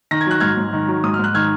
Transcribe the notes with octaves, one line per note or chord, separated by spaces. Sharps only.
D#3 A#6
G#6
F#3 F#6
G#2 F6 G#6
G#2
D#3
F#3
G#2 D#6
F6
G#2 F#6
D#3 F6 G#6